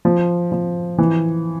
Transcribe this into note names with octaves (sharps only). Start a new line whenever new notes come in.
F3
F3
E3